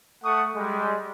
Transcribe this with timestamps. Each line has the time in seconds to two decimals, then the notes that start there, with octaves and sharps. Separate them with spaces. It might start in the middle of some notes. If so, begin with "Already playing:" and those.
0.24 A3 A4 F#5 C#6 D#6
0.56 G3 G#3